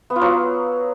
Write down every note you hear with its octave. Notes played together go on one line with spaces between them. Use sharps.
B3
F4
F#3